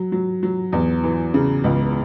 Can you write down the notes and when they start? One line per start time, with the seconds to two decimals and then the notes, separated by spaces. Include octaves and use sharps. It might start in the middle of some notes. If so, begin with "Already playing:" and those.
Already playing: F#3
0.12 F#3
0.43 F#3
0.72 E2
1.04 E3
1.34 C#3
1.64 C#2